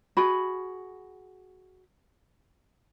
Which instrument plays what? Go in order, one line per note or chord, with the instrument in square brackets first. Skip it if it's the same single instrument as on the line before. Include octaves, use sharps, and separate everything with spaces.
[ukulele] F#4 G#4 B5